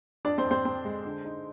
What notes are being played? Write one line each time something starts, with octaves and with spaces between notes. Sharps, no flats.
F2 D4 D5
C4 C5
F2
C4 C5
C4
G#3
D3
D#4